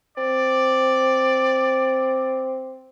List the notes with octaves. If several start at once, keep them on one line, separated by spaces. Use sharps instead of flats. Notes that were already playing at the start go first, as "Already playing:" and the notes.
C4 D5